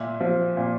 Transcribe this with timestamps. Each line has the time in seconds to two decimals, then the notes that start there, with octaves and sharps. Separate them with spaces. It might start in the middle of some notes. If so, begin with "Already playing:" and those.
Already playing: A#2 E5
0.20 F3
0.57 A#2